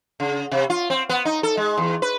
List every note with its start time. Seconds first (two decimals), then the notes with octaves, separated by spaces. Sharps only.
0.20 C#3
0.51 C3
0.70 F4
0.90 C4
1.09 B3
1.25 D#4
1.43 A4
1.57 G#3
1.78 E2
2.02 B4